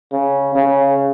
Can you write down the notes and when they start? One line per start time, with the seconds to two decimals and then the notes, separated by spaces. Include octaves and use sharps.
0.12 C#3
0.55 C#3